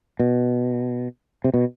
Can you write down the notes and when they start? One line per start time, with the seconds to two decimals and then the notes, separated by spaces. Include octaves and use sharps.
0.20 B2
1.44 C3
1.54 B2